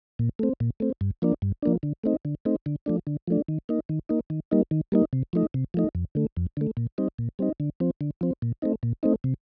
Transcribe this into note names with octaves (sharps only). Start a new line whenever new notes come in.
A#2
A3 C4
A#2
A3 C4
G2
F3 A#3 D4
G2
F3 A#3 D4
D3
A3 C4 D#4
D3
A3 C4 D#4
D3
F3 A3 D4
D3
F3 A3 D4
D#3
A#3 D#4
D#3
A#3 D#4
D#3
G3 A#3 D#4
D#3
G3 A#3 D#4
C3
F3 A3 D#4
C3
F3 A3 D#4
F2
D3 A3
F2
D3 A3
A#2
G3 C4 D#4
A#2
G3 C4 D#4
D3
F3 C4
D3
F3 C4
A#2
A3 C4 D#4
A#2
A3 C4 D#4
C3